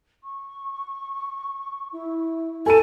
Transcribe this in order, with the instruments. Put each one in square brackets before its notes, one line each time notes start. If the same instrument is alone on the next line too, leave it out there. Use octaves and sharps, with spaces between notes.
[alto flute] C#6
E4
[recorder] A4 [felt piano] G#5 D#7